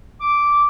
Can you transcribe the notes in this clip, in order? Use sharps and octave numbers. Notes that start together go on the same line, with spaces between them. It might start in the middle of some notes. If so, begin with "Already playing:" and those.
D6